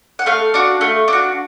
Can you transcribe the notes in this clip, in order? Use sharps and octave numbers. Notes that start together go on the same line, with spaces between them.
F#5
A3 F5
D4 F#4
A3
D4
F#4